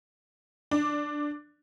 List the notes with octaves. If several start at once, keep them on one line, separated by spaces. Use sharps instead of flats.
D4